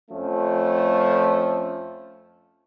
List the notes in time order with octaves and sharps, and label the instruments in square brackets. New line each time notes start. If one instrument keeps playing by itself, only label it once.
[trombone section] F2 F3 A3 C#4